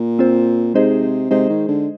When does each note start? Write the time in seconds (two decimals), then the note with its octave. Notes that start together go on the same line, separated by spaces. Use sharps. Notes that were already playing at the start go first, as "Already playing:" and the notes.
Already playing: A#2
0.19 C4 F4 C5
0.74 C3 G#3 D#4 G#4 C5 D#5
1.30 C3 G#3 D#4 G#4 C5 D#5
1.50 D#3
1.68 D3